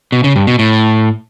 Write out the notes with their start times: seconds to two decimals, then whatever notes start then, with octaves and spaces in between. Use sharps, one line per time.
0.12 B2
0.24 C#3
0.36 G2
0.47 B2
0.59 A2